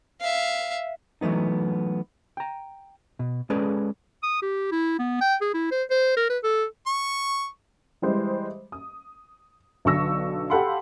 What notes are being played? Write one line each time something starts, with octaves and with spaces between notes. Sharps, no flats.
E5 F5
E3 F#3 A3 B3 D#4
G5 A#5
B2
G#3 C#4 G#4 A4 B4 D5
D#6
G4
E4
B3
G5
G#4
E4
C5
C5
A#4
B4
A4
C#6
E3 G3 G#3 C5
D#6
B1 D3 F#3 C#6 E6 A#6
G4 A4 F5 F#5 B5 C6